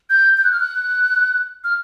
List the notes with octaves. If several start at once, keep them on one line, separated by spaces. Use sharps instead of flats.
G6
G6
F#6
F6
F#6
F6